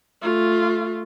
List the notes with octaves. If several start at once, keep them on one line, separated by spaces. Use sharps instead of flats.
A3 F4